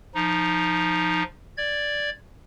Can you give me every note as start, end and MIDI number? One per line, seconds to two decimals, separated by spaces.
0.15 1.23 53
0.15 1.23 63
1.57 2.10 74
1.57 2.10 92